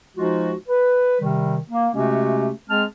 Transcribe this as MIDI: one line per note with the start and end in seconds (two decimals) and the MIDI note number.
0.17 0.52 53
0.17 0.52 56
0.17 0.52 63
0.17 0.52 65
0.17 0.52 66
0.69 1.18 71
1.21 1.58 48
1.21 1.58 51
1.21 1.58 55
1.70 1.90 58
1.95 2.50 48
1.95 2.50 56
1.95 2.50 57
1.95 2.50 61
1.95 2.50 66
1.95 2.50 67
2.69 2.83 56
2.69 2.83 60
2.69 2.83 68
2.69 2.83 81
2.69 2.83 89